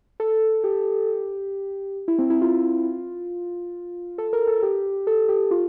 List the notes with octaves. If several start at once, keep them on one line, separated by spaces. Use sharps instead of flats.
A4
G4
E4
C4
E4
F4
A4
A#4
A4
G4
A4
G4
F4